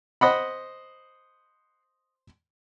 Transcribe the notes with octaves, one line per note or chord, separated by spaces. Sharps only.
C5 D#5 F#5 B5